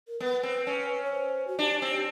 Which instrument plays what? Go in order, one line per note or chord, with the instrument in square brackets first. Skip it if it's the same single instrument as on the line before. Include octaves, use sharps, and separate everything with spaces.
[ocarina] A#4
[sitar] B3 [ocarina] B4
[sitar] C4
C#4
[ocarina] C#5
C5
F#4
[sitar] D4 [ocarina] G4
[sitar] C4